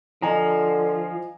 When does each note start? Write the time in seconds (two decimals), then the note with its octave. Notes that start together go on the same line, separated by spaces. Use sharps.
0.22 D3 F3 D#5 G#5 A#5